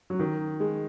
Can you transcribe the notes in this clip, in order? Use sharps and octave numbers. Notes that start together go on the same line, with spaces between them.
F#3
D#3
G#3